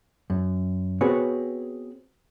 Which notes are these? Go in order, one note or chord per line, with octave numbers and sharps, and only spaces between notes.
F#2
B3 C4 F#4 G#4 B4 C#5